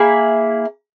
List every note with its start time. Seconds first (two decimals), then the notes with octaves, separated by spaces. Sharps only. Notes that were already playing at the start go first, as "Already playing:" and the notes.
Already playing: A#3 E4 G#4